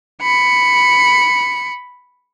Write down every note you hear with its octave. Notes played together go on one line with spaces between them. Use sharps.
B5 C#7